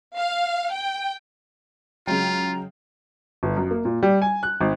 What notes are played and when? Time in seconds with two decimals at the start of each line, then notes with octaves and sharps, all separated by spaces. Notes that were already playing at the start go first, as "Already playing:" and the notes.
0.16 F5
0.73 G5
2.07 C#3 F#3 G#3 F4 G5 A#5
3.43 G1
3.56 F#2
3.71 A#3
3.85 A#2
4.03 G3
4.22 G#5
4.43 F#6
4.61 G#1